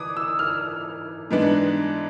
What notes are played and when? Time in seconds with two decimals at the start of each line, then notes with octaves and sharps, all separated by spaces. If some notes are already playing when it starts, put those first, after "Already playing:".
Already playing: E3 D6 D#6
0.17 E6
0.39 F6
1.31 G#2 E3 G#3 B3 D4